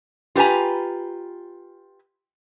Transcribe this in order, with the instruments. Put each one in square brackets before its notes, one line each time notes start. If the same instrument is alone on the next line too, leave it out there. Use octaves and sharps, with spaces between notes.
[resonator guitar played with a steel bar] F4 G4 B4 G#5 A#5